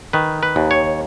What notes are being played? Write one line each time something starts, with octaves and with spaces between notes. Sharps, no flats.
D#3 B4
B4
D#2
C#5